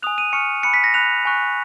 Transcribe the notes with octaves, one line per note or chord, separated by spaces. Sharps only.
G#5 D#6 F#6 F7
D#7
G#5 C#6 F6 C#7
G#5 B5 F#6 C#7
B6
A#6
B5 F#6 F7
G#5 C#6 F#6